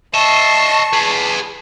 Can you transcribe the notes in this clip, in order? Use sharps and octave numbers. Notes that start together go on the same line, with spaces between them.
D#5 E5 A5 C#6 C7
G#4 B4